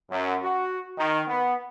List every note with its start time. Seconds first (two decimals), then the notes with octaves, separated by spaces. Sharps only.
0.10 F#2
0.43 F#4
0.98 D#3
1.27 B3